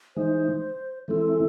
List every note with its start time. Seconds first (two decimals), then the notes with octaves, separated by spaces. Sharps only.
0.16 E3 G#3 D#4 C5
1.08 E3 G#3 C4 E4 A4